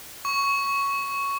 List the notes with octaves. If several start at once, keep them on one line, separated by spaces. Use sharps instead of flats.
C#6